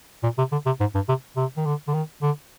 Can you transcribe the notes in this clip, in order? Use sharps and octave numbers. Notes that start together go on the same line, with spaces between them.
A#2
C3
D3
C3
G#2
G2
C3
C3
D#3
D3
D3
D#3
D3